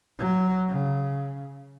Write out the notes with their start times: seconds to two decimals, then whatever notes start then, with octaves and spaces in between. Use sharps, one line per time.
0.19 F#3
0.69 C#3